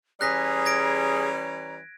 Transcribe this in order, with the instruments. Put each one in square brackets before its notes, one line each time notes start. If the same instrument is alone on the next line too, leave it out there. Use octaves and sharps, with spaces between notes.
[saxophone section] E3 G3 C#4 [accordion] G#4 [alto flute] A#5 [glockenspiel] F#6 A#6 B6
[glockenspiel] G#6 A#6 D7